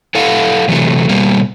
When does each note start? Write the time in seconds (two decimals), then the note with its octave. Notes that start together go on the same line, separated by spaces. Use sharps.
0.15 E4 A4 F5 F#5
0.68 A2 C3 E3 F#3 A3
1.09 B2 G3 A#3